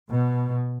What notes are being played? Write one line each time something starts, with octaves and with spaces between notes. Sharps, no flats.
B2